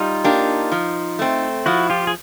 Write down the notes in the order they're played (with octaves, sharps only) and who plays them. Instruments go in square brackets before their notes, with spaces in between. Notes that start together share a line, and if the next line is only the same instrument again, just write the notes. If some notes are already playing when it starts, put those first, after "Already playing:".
Already playing: [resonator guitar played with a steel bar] G3 [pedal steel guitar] D#4 F4
[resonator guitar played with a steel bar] A#3 D4 G4
F3
A3 C4
[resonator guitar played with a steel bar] F3 [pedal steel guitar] E4 F#4
[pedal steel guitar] F4 G4
G#4